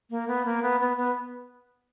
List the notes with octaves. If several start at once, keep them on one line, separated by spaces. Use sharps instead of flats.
A#3
B3
A#3
B3
B3
B3